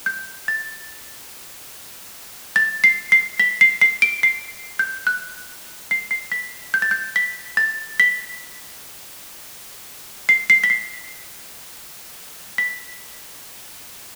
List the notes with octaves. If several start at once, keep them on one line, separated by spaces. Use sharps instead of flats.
G6
A6
A6
C7
C7
B6
C7
C7
D7
C7
G6
F#6
C7
C7
B6
G6
A6
G6
B6
A6
B6
C7
C7
B6
C7
B6